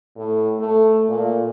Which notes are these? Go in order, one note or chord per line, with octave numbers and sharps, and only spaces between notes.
A2
A3
A#2